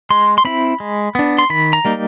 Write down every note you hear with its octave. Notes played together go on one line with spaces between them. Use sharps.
G#3 C6
C6
C4 E4 B5
G#3
B3 D4
C6
D#3 B5
A#5
G3 A#3 D#4